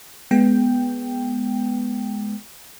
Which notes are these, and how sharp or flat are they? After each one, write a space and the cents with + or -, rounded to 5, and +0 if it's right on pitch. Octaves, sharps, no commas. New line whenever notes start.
G#3 +10 B3 +0 G5 +0